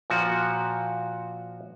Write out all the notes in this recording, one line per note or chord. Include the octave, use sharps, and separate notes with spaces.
A#2 F3 F#4